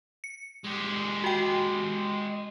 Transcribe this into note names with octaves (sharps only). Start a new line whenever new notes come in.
C#7
G#3 G4
F#4 G5